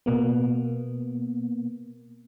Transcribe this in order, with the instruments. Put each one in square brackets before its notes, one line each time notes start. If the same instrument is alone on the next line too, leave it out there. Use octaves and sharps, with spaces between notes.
[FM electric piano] B2 A#3 B3